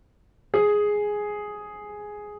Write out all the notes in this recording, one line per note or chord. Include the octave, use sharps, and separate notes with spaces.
G#4